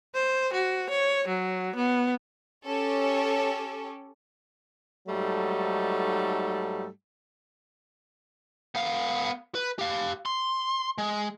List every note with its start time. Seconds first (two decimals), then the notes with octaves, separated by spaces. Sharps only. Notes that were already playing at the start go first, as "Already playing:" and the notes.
0.15 C5
0.54 F#4
0.90 C#5
1.28 F#3
1.76 B3
2.67 C#4 G4 A4 C#5
5.08 G#2 F#3 G3 A3 D#4 A4
8.75 B3 F5
9.55 B4
9.79 G4 F5
10.26 C6
10.98 G#3